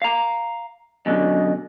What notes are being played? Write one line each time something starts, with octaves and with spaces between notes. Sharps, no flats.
F5 A#5
F#2 B2 D3 D#5